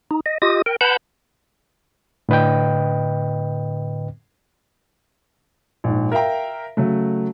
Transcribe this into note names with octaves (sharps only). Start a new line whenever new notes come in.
D#4
D#5
F4 G4 D#5 D#6
A#4 G5
B4 F#5 A5 B5 G6
A2 D3 B4 D#5 G5
A#1 G#2
A#4 E5 F5 G5 A#5
C#3 F#3 A3